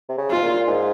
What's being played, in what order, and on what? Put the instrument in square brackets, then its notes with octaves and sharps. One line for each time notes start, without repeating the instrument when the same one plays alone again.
[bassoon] C3
C#3
[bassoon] G#2 [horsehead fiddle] F4
[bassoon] A#2
G#2